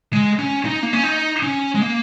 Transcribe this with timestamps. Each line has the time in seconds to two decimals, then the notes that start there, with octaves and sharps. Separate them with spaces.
0.13 G#3
0.39 C#4
0.65 D#4
0.83 A#3
0.93 C#4
1.04 D#4
1.43 C#4
1.75 G#3
1.81 A#3